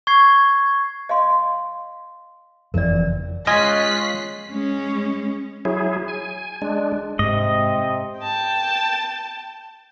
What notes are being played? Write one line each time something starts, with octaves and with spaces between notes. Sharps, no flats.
C#6 G#6 C7
D#5 F5 C6
F#1 F2 E3 A#4 D5
G#3 C#4 F4 D#5 G#5 F#6 B6 C7
G#3 C#4
F#3 E4 G#4
G#5
G#3 D4
G#2 C3 D#5
G5 A5